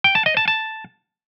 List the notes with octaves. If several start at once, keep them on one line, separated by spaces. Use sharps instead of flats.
G5
A5
D#5
A5
A5